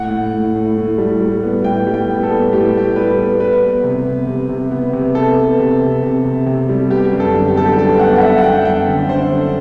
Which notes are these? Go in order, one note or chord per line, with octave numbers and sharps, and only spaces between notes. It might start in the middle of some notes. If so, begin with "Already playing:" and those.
Already playing: A2 F#5
A2
A2
A2
A2
G3
G3
B3
A2 G5
G3
G5
B3
A4
B3
A2 G4
A2 G4
G3 B4
B3
B3 B4
B3
C3
B3
C3
C3
B3
C3
B3 A4
B3
C3
C3
C3
C3
C3
G3
B3 G4
F#2
A4
D3
G4
B3 A4
G4
G3 A4
G5
B3 F#5
F#5
B3 E5
F#5
F#2 G5
F#2 G5
D3
D3 C5
D3